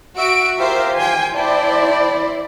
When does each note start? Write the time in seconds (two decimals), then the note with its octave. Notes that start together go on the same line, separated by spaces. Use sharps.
0.18 F#4 E5 E6 D7
0.59 F4 G4 A#4 C5 E5 F5
0.96 G5 G#5 C6
1.36 E4 C5 D5 G5 A5